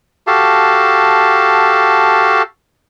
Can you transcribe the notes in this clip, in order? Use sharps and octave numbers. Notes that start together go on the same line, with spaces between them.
F#4 G4 A4 F5 A5